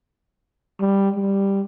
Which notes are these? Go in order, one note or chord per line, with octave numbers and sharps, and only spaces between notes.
G3
G3